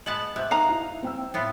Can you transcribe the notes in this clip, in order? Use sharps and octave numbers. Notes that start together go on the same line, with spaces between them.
G#3 B3 A5 F#7
C3 F#6
D#4 F5 A#5
E4
C4 G5 E6
A2 B3 F4